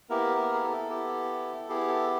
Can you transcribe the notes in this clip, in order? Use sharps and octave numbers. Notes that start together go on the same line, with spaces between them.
A#3 B3 E4 G4 A#4
A#3 A#4
G#4
A4
B3 E4 G4
B3 E4 G4 G#4
A4